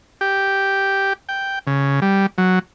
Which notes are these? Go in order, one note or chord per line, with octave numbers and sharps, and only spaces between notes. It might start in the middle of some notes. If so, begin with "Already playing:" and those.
G4
G5
C#3
G3
F#3